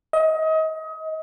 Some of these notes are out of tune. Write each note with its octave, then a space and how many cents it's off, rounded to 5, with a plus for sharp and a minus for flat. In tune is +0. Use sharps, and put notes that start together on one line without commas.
D#5 +30